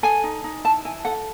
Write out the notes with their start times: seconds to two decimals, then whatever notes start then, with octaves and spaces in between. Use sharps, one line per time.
0.03 A4 G#5
0.24 D#4
0.44 D#4
0.64 E4 A5
0.85 E4 G#5
1.05 A4 F#5